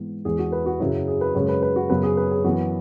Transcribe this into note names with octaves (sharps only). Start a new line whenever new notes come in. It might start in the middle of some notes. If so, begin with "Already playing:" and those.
Already playing: G#2 E3 B3
E2 E3 G#3 G#4
F#4
B4
F#4
F#2 C#3 F#3 E4
G#4
B4
F#2 C#3 G#3 C#5
B4
B4
F#4
F#2 C#3 F#3 B3 B4
G#4
B4
G#4
F#2 E3 B3 F#4